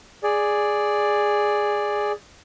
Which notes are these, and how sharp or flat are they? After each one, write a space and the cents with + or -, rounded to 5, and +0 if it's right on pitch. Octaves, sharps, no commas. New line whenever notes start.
G#4 +0 D5 +0